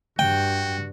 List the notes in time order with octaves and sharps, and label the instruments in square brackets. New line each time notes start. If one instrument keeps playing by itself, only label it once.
[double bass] G2 [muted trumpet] F#4 [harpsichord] G5